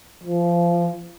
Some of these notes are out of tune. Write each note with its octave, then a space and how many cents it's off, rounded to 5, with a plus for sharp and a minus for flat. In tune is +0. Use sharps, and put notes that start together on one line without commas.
F3 -20